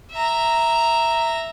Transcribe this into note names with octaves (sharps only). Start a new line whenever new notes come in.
E5 A#5